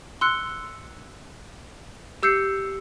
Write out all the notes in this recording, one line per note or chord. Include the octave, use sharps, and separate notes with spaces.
C6 E6 F#6 C#7
G4 E6 G6 C7 C#7